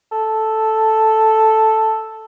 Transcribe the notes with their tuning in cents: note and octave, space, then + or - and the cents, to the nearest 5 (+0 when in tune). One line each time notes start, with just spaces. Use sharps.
A4 +0